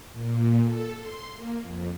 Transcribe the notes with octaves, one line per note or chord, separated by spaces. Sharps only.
A#2
A4
C6
A#3
F2